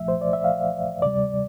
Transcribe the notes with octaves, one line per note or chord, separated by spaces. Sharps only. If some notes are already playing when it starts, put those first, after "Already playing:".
Already playing: C2 A#2 F3 A3 E5
C5
D5
E5
F5
D2 C3 G3 D5